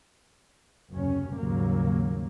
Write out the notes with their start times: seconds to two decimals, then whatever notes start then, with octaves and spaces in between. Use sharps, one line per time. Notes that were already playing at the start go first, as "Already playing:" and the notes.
0.91 F#1 D#2 C3 F#3 C#4
1.37 D#2 G#2 C#3 F#3 G3 A#3